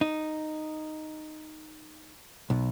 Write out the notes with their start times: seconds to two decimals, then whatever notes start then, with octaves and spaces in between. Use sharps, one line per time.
0.01 D#4
2.50 B1